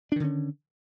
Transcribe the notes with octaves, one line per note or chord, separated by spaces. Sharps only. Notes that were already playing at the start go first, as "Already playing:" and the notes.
D3 D#3 C#4 D4